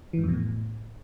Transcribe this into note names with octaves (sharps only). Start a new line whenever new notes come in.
E3
G#2
F2
B2
A2